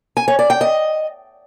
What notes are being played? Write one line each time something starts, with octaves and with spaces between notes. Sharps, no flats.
G#5
C#5
D5
G5
D#5